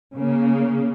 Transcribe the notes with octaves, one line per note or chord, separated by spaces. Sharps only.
C#3 A#3